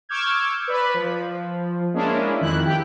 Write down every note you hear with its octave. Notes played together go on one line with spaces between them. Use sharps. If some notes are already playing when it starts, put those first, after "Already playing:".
C#6 D6 E6 F6 G6 G#6
B4 D5 B5
F3
G#3 A#3 C#4 D4 E4
F2 D#3 E4 F#6
G4 G5